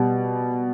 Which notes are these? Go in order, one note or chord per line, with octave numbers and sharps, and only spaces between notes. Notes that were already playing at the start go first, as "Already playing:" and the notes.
Already playing: B2 G3